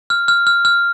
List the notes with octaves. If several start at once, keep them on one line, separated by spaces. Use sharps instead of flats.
F6
F6
F6
F6